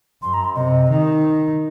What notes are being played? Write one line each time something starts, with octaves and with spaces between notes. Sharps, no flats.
F#2 C6
A#5
C6
C3 D#5
D#3